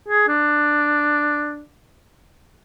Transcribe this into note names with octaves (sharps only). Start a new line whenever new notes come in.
G#4
D4